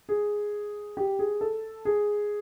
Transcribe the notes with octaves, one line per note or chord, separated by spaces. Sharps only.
G#4
G4
G#4
A4
G#4